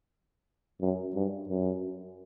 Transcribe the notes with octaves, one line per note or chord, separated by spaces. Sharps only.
F#2
G2
F#2